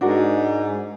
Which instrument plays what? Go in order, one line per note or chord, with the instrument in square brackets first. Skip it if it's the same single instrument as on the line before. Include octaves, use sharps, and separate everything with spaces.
[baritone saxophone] G#2 [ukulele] D4 F#4 A#4